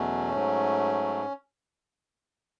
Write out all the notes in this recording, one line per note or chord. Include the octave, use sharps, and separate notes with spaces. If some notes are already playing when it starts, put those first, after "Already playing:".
Already playing: E2 B2 F#3 A3 C#4
G#2 F#3